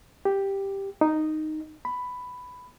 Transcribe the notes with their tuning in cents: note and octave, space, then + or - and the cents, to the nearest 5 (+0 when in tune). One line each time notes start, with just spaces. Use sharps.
G4 +5
D#4 -5
B5 +10